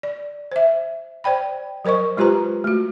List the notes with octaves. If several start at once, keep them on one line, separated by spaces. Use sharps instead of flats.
D5
C5 E5
C5 D5 G5 B5
F#3 A#4 C5 D#5 C#6
G#3 F4 G4 B4 C5 A#5
A3 F#4